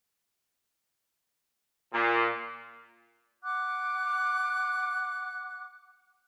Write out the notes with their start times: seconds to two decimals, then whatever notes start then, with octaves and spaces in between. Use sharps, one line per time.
1.93 A#2
3.44 F#5 D6 F#6